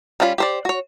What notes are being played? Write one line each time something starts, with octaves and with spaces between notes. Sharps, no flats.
G3 C#4 F4 F#5 B5
G4 C5 D5
F#4 C#5